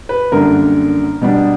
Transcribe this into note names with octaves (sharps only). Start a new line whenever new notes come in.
B4
F#2 D3 G3 A#3 D4 A#4
B2 G3 B3 D4